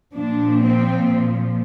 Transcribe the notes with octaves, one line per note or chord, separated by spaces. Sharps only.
A#2 F3 D4
C4